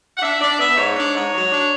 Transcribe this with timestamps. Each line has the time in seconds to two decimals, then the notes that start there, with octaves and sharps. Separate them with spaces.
0.18 F#5
0.22 D4 E5
0.41 D4 D5
0.59 B3 E5
0.77 G#2 C#5
0.96 D4
1.15 G#2
1.34 F#3
1.52 D4